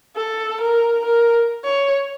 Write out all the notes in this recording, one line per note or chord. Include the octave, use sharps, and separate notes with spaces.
A4
A#4
A#4
C#5